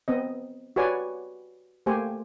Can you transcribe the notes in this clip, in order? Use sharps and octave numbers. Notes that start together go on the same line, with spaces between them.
B3 C4 D#5
F#4 G4 B4 C#5 D5 G#5
A3 A#3 G4 C5 G#5